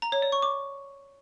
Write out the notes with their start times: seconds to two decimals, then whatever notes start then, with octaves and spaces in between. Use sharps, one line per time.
0.02 A#5
0.12 C#5
0.22 D5
0.32 C#6
0.42 D6